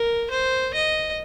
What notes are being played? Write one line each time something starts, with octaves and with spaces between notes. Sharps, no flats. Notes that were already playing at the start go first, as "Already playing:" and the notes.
Already playing: A#4
C5
D#5